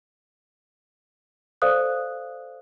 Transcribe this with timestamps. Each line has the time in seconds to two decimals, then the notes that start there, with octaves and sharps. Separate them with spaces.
1.62 A4 C5 D5 F5 D#6 F#6